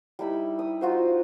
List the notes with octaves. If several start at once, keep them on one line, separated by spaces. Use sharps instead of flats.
G3 D#4 E4 B5
D#6
D#4 F4 F#4 C5